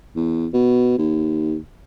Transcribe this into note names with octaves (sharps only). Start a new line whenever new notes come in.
E2
B2
D#2